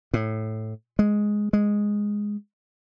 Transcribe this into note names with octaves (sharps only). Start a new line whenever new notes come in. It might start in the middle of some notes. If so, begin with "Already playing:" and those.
A2
G#3
G#3